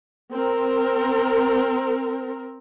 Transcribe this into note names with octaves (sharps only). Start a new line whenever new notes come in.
C4 A#4